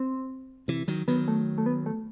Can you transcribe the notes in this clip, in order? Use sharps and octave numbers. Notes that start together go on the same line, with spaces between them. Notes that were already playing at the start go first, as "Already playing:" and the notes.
Already playing: C4
C3 E3
D#3 F#3
D#3 F#3 B3
A3
A3
B3
A3